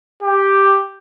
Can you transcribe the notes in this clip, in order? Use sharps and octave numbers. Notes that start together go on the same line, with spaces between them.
G4